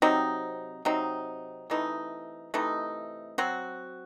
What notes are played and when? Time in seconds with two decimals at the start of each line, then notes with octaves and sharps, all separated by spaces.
0.02 C3 F#3 C4 D#4
0.85 C3 F#3 C4 D#4
1.70 C3 E3 A3 D#4
2.54 C3 E3 A3 D#4
3.38 F#3 C4 F#4